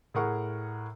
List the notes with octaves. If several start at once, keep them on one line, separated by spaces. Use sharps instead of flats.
A2 G#4 A#4 F#5 C#6